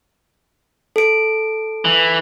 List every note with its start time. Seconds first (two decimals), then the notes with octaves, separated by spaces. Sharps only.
0.96 A4 D7
1.85 E3